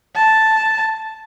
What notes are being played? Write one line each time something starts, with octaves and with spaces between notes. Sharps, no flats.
A5